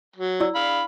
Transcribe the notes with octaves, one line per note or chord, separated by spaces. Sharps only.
F#3
E4 D5 E6
F5 B5